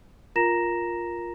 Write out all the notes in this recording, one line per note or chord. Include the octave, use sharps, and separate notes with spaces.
F4 A#4 A#5 A#6 E7